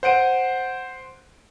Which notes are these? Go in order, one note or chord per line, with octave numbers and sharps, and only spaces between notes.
C5 F#5 D7 D#7